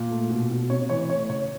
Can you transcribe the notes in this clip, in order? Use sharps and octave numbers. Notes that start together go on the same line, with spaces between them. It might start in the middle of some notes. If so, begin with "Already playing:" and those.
Already playing: A#2
A3
B2
B2
C3 C#5
E3 C#5
A3 C#5
C#3 C#5